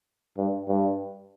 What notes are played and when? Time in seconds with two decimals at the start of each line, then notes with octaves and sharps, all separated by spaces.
0.37 G2
0.68 G2